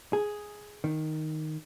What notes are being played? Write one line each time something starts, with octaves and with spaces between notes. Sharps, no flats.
G#4
D#3